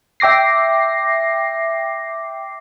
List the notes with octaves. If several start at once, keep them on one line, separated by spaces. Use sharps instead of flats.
E5 G5 D6 A#6 C7